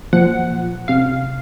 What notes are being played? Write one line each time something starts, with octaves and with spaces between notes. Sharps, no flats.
A#2 F3 F#5
C3 F5